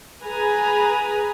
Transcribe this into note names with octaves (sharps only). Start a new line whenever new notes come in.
G#4 B4 G#5 A#5